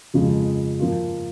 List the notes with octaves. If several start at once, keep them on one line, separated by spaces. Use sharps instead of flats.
F2 C#3 F3 G#3
F3 A#3 F4